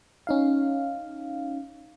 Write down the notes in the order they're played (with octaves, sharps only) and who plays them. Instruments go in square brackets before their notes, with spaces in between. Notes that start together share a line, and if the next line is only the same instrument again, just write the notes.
[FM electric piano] C#4 D#4 F5